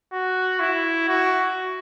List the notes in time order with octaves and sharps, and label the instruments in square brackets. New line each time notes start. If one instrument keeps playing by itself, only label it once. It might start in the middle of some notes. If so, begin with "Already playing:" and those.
[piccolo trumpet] F#4
E4
F#4